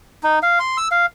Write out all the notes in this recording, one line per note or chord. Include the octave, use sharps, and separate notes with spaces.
D#4
F5
C6
E6
F5